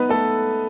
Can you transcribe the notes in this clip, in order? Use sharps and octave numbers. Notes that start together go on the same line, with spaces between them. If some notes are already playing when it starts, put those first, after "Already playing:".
Already playing: B3 D#4 B4
A3 A4